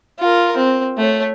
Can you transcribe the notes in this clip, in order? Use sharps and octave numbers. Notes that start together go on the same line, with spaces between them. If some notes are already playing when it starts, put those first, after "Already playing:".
F4 A#4
C4
A3 C#5